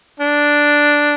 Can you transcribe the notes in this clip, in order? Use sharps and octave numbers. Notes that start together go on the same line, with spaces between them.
D4